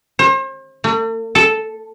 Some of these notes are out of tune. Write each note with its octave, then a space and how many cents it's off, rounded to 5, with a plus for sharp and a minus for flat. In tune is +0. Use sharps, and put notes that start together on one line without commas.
C5 +40
A3 +45
A4 -5